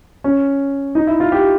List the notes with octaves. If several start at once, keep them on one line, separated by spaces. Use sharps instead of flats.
C#4
D#4
E4
F4
G4